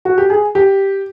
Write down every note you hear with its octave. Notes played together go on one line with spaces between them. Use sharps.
F#4
G4
G#4
G4